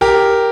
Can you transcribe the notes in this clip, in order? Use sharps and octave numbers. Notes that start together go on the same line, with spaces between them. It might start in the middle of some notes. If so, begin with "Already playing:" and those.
G4 A#4